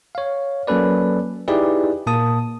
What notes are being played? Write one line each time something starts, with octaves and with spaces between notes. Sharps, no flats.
C#5 F5
F#3 A#3 C#4 A4 B4 D5
D#4 E4 G4 G#4 B4 D5
A#2 A#3 A5 D#6